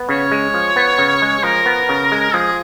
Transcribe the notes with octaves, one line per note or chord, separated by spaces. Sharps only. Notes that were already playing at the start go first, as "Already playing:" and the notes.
Already playing: B3
C#3 C#5
G#3
F3
B3
C#3
G#3
F3 A#4
B3
C#3
G#3
F3 G#4